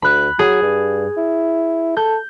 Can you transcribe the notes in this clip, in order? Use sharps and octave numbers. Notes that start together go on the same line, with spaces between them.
D2 B5 F#6
F#3 G#4
G2
E4
A4 G6